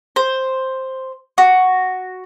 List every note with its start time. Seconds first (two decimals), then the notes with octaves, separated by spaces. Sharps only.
0.16 C5
1.38 F#4